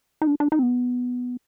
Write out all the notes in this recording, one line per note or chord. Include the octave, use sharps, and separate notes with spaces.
D#4
D4
D4
D#4
C4
B3